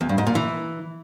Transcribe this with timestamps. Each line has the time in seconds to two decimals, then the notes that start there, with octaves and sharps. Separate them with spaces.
0.01 E2
0.09 G2
0.18 G#2
0.27 A#2
0.35 E3